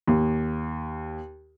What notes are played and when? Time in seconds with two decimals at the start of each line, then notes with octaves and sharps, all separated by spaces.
0.08 D#2